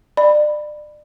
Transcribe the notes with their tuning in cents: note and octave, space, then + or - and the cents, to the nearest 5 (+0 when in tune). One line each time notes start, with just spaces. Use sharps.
D5 +30 B5 +0